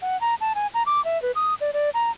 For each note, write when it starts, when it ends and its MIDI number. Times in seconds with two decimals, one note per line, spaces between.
0.02 0.19 78
0.21 0.35 82
0.41 0.53 81
0.55 0.67 80
0.74 0.83 82
0.86 1.03 86
1.05 1.20 76
1.22 1.32 71
1.36 1.54 87
1.61 1.71 74
1.73 1.90 74
1.94 2.11 82